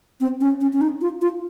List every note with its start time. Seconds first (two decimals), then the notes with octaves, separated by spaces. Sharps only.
0.21 C4
0.41 C#4
0.61 C#4
0.73 C#4
0.81 D#4
1.01 F4
1.21 F4